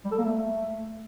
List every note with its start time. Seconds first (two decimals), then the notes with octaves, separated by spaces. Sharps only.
0.05 G3
0.12 A4
0.18 A#3
0.25 A3